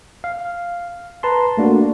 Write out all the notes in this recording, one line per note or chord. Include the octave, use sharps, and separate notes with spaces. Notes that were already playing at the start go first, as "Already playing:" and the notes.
F5
B4 A5 A#5 C6
A3 A#3 D4 F#4